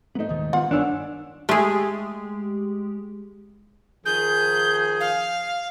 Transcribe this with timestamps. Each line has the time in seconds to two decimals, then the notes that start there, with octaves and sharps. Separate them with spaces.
0.15 G#2 A3 B3 D#4
0.29 D#1 D#3
0.53 D#3 G#3 B3 F4 F#5
0.71 G1 G2 D#3 D4 C#5 G#5 E6
1.49 G#3 A3 G4 G#4
4.06 D#3 F3 G#4 G6
5.00 F5